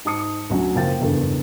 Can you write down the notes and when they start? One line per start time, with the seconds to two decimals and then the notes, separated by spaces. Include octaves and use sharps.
0.05 G#2 A5 D#6 C#7
0.50 D2 F#3 C#4
0.75 F#1 F3 A#3 G5 A6
1.00 F#1 E2 G2 A4